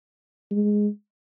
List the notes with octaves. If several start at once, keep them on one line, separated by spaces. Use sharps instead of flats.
G#3